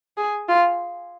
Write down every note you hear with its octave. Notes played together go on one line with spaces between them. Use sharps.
G#4
F4